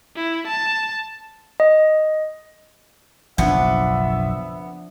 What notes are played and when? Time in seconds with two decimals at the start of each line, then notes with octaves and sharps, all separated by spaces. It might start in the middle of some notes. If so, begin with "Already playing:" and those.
0.16 E4
0.47 A5
1.60 D#5
3.38 F#1 B1 F3 B3 D4 E5